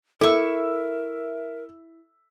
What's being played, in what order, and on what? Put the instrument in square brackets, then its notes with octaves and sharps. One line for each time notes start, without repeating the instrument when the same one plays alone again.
[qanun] E4 C#6 [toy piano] A4 [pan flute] A#4 [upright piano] E5 E6